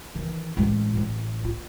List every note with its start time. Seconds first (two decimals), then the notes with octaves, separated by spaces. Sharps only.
0.15 D#3 E3
0.57 A1 G#3
0.97 A1
1.45 F4